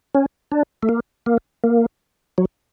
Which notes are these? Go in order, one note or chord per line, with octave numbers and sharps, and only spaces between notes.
C#4
D4
A3
A#3
A#3
A#3
F#3